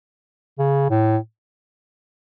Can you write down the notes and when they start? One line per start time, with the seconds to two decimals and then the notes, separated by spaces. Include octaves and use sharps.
0.59 C#3
0.90 A2